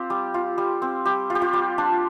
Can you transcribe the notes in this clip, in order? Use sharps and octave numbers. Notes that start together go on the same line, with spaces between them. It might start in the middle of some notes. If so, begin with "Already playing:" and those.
Already playing: C4 F4 G4
G3
F4
G3
C4
G3 G4
F4
G4
F4
G3
D4 F4